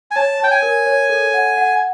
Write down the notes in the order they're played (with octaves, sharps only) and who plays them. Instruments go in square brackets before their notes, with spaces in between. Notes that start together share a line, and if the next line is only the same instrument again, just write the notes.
[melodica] G#5
[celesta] C#5 [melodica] A5
[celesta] C#5 [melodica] G5
[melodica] G#5
[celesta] A#4
C#5
A4
F#5
F#5